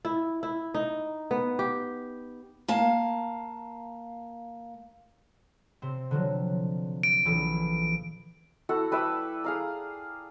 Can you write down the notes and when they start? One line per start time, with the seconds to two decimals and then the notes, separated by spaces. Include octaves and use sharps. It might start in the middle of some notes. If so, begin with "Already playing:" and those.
0.05 E4
0.43 E4
0.74 D#4
1.31 B3
1.59 G4
2.68 A#3 F5 A5
5.82 C3 C4
6.11 D3 F3 F#3
7.03 D7
7.25 A#1 E3 A4
8.69 E4 F#4 A4 F#5
8.91 G3 B4 D5 E5
9.44 G#4 F5 A#5